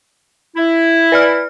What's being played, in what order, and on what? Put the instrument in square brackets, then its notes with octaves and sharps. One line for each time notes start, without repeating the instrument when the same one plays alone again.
[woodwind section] E4
[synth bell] B4 D5 F6